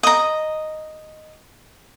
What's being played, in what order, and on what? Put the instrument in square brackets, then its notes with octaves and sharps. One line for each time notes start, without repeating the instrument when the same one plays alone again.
[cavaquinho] D#5 A#5